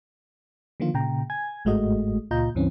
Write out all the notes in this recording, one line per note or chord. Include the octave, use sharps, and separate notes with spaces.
D3 D#3 F3 A#3 F4
A#2 C#3 G5 A#5
G#5 G#6
G1 G#2 G#3 A3 F#4 D#5
C#2 A#2 F4 D#5 A#5 G6
C#2 G2 E3 C4 C#4